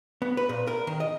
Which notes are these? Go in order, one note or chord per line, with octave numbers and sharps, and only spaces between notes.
B3
B4
A#2
A#4
D#3
D#5